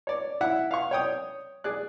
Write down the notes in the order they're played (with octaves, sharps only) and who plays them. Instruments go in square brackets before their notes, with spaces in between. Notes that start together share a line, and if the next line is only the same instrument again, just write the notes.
[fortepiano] C#5 D5
E4 E5 F#5
F5 F#5 C#6
C#5 G5 D#6
G#4 D5 F#6